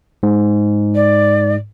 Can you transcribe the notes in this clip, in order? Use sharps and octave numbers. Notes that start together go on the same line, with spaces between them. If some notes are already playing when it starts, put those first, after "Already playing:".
G#2
D5